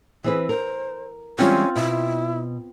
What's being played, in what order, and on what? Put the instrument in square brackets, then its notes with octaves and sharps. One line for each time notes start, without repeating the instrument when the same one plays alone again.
[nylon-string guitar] E3 C4 B4 [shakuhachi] G#4
[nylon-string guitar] A#4 [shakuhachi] C5
[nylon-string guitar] E3 G3 G#3 [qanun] C4 F4 [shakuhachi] C#4
[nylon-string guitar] B2 [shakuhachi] E4